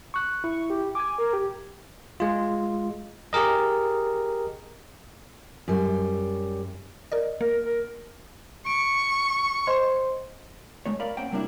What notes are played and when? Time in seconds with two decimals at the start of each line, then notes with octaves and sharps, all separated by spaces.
0.14 C#6 F#6
0.44 E4 C#6
0.70 G4
0.95 G#5 D6 G#6
1.18 A#4
1.33 G4
2.20 G#3 F4
3.33 G4 G#4 A#4 D#5
5.68 F#2 G3
7.12 A#4 D5 D#5
7.41 A#3 A#4
7.63 A#4
8.66 C#6 D7
9.67 C5 D#5 C6
10.86 G#3 A3 C#5
11.00 A#4 D5 F5 B5
11.17 A#3 C#4 C5 F#5 G5
11.31 C3 G3 A#3 D4 E4